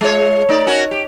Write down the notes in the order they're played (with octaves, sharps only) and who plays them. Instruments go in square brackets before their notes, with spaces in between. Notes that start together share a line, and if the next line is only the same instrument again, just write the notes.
[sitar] G#3 F4 C#5
A3 D#4 D5
C#4 F#4 A#4
G4